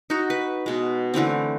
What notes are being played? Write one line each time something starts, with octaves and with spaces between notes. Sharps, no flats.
D#4 F#4
B4
B2 G#3
D3 E3 A3 C4